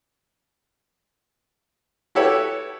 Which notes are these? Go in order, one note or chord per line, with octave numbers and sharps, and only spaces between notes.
E4 F#4 G4 A4 B4 C#5